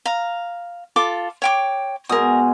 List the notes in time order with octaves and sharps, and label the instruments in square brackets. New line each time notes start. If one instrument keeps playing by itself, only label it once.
[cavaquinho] F5 A#5
F4 A4 D6
C#5 G5 D6
[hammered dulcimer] B2 G#3 G#4 [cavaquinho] A#4 D#6